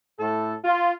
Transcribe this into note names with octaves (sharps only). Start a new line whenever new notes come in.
A2 A4
F4